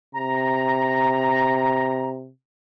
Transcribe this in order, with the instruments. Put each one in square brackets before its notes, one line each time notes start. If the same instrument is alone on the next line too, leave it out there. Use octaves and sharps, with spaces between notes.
[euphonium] C3 [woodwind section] A#5